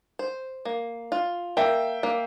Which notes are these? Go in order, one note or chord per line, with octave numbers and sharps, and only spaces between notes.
C5
A#3
F4
A#3 E5 G5
A#3